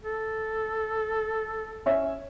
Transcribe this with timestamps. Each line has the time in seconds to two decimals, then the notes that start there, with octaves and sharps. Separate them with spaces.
0.04 A4
1.86 C#4 C#5 E5